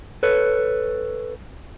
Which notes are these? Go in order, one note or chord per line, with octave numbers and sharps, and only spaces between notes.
A4 B4 C#5